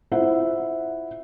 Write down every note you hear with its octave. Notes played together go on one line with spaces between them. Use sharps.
E4 F4 C5 E5 F#5